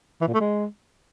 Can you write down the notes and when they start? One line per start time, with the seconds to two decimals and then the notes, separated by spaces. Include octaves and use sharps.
0.21 E3
0.28 A#2
0.34 A3
0.40 G#3